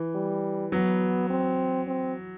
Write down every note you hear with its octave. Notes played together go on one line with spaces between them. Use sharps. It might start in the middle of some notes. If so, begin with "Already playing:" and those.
Already playing: E3
G3
F#3 B3
C4
C4